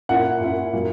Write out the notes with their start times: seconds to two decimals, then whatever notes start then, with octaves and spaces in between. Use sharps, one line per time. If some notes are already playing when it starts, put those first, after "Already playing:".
0.09 A#2 A#3 C#4 E4 F#5
0.41 A#2 A#3 C#4 E4
0.73 A#2 F#3 A#3